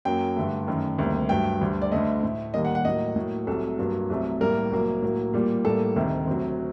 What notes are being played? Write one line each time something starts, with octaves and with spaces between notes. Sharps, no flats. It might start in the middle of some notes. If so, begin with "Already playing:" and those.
F#2 F#3 A#3 G5
G2 D3 A3
F#2 D#3 A3
D2 C3 D#3 G3 A#3
G2 F#3 A3 G5
D2 D3 G3
D5
D2 D3 A3 D#5
A2 A3
D#2 D#3 G3 A#3 D#5
F#5
F#5
A2 F#3 A#3 D#5
A2 F#3 A#3
C2 C3 F#3 A3 A4
G2 F#3 A#3
C2 C3 F#3 A3
A2 G3 A#3 A#4
C2 C3 F#3 A#3
A2 F#3 A#3
A#2 G3 A#3
A2 G3 A#3 A4
D2 C3 D#3 A3
D2 C3 F#3